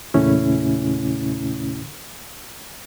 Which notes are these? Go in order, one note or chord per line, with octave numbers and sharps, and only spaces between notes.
E2 A#2 C#3 A3 C#4 E4